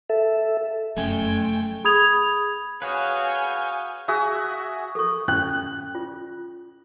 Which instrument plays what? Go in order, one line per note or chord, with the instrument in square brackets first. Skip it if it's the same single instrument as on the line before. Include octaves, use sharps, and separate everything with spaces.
[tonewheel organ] A4 E5
[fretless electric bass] F1 F#2 C#4 [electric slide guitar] A3 G#5 [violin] G5
[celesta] G#4 B5 D#6 G#6 F7
[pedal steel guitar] F#4 G#4 B4 [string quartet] C#5 G#5 G6 [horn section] F5
[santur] F#4 G#4 E5 D#6
[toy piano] A4 C#6
[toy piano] C#4 [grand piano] F#6
[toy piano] F4